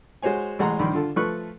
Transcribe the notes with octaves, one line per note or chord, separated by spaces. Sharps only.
G#3 F#4 C5 C#5 G#5
A1 G#3 F#5 A#5 C6
A#1 G2 D#3 B5 C6
D3 F4 A4
F3 A3 B4 C#6 F#6